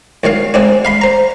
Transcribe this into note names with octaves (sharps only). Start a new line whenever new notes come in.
B1 D#3 C#5 F5
C#3 G#3 C4 D4
F5 B5 C6
C5 A#5